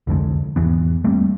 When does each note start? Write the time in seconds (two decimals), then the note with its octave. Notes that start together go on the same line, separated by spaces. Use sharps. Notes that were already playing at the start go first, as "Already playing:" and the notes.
0.07 C2 F2 D3 G#3
0.56 G#1 E2 E3 B3
1.04 G3 A3 A#3 C4